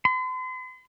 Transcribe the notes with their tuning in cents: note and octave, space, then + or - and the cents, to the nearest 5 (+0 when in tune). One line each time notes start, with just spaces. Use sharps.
C6 -45